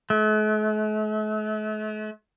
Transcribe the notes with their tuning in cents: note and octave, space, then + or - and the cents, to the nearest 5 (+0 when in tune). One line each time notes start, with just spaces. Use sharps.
A3 -45